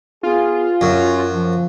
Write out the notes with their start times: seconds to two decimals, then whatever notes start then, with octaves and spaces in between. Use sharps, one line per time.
0.23 B3 F4 G#4
0.81 F#2 C#4 F#4
1.32 F3